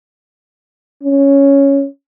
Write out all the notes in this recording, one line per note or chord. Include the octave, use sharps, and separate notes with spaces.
C#4